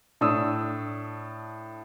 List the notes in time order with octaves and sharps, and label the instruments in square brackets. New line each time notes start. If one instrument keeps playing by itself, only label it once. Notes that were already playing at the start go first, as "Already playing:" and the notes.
[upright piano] A2 D4 D#6 E6